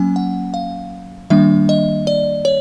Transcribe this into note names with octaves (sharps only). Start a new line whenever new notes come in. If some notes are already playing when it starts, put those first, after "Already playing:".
Already playing: F#3 A#3 C#4 G#5
F#5
F5
D#3 G3 A#3 D4 E5
D#5
D5
C#5